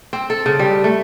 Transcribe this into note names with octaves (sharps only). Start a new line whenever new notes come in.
C4
A4
C#3
G3
A3